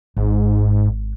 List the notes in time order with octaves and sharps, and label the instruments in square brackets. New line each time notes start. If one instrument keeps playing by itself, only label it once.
[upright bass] G#1 [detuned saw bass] G#2